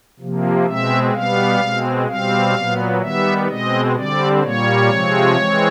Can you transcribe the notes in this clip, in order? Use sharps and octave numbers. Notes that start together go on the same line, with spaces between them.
C3 F3 A#3
B2 G#3 C4 E5
B2 G3 B3 F5
B2 G#3 C4
B2 G3 C4 F5
A#2 F#3 B3
D#3 G3 B3 E5
B2 G#3 C4 D#5
D3 G3 C4 D5
A#2 G3 A#3 C#5
C3 F3 G#3 C4
E3 G#3 C4